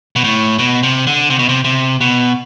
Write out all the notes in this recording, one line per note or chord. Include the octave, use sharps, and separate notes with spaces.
B2
A2
B2
C3
D3
C3
B2
C3
C3
B2